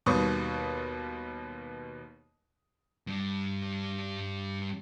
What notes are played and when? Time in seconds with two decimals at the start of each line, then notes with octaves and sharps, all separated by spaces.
0.06 D#2 B2 G3 B3 C#6 D#6
3.07 G2 G3